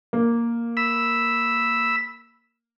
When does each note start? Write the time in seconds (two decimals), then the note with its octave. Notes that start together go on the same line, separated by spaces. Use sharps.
0.13 A#3
0.77 B5 E6